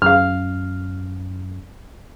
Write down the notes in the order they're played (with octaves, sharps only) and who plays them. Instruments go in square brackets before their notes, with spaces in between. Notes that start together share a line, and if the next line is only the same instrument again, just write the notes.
[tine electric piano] F#2 [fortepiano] F5 F6